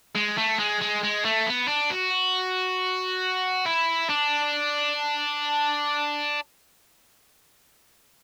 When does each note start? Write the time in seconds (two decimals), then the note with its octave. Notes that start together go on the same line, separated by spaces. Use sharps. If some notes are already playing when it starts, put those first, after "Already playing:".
0.15 G#3
0.37 A3
0.59 G#3
0.81 G#3
1.03 G#3
1.25 A3
1.46 B3
1.68 D4
1.91 F#4
3.66 E4
4.09 D4